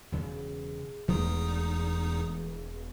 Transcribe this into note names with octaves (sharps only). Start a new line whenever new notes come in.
E1 C#3 G#4
E1 E2 E3 G#3 A3 D#4 D#6